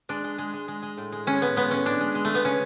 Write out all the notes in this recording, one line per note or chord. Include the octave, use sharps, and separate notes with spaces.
G#3 D4
G#3
G#3
G#3
G#3
G#3
A2
G#3
G#3 C#4
A2 B3
G#3 B3
A2 C#4
G#3 D4
G#3
G#3
A3
G#3 B3
C#3 C#4